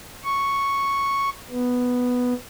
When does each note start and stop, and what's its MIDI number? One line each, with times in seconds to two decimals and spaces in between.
0.24 1.29 85
1.51 2.34 59